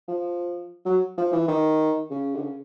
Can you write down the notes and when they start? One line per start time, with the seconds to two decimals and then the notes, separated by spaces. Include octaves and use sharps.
0.08 F3
0.85 F#3
1.18 F3
1.32 E3
1.48 D#3
2.10 C#3
2.35 D3
2.41 C#3